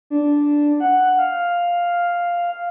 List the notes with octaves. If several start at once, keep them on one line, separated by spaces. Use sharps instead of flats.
D4
F#5
F5